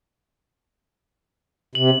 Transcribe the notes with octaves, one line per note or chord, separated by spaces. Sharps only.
C3 F#7